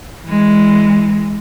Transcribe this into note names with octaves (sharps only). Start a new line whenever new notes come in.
E3 G#3